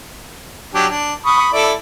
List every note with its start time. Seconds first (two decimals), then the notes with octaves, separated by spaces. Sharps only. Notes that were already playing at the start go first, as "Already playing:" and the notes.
0.74 F#3 D4 G4
0.90 D4
1.26 B5 C#6 D#6
1.53 E4 A4 D5